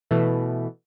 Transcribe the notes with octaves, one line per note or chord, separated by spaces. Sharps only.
B2 E3 A3